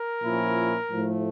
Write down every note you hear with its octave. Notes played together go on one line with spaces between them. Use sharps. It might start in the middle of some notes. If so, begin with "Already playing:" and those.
Already playing: A#4
A#2 F3 C#4 E4
A2 F3 A3